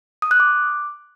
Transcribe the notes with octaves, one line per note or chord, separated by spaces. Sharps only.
D#6
F#6
D6